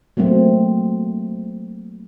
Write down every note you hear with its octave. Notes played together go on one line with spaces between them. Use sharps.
F#3 A3 A#3 C4